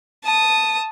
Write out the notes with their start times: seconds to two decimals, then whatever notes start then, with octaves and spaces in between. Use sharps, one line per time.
0.24 A5 D#6